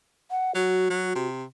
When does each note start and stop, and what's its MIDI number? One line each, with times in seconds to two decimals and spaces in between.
0.31 0.54 78
0.55 0.86 54
0.55 1.28 66
0.90 1.15 54
1.15 1.44 48